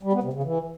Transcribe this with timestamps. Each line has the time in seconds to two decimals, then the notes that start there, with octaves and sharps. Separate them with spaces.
0.03 G3
0.13 B3
0.23 C3
0.33 C#3
0.43 E3